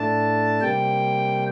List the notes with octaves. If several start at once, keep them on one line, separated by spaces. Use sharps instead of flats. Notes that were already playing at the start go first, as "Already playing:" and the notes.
Already playing: A2 A3 D4 A5
C3 G3 A#3 G5